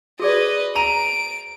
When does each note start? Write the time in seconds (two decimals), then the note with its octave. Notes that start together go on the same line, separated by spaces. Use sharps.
0.20 F#4 G#4 B4 D5 D#5
0.75 A#5 D7 D#7 F7